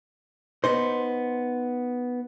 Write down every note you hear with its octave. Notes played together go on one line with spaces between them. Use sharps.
B3 D#4 C5